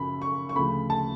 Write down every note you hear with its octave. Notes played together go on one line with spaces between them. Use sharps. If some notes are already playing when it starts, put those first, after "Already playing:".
Already playing: F#2 C#3 F3 B5
C#6
C#6
D2 C#3 F3 A3 B5
A5